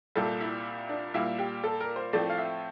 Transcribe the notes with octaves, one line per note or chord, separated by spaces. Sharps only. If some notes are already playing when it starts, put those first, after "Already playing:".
C2 A#2 G3 A4
E4
D4
A#2 G3 A#3 E4
G4
A4
A#4
C5
A2 F3 A3 C4 D5
F5
E5